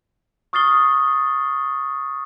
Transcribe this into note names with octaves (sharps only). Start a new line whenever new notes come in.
C#6 D#6 F6 A6 C7 G7